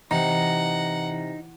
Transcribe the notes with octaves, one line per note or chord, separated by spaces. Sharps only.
C3 E3 D#4 F#5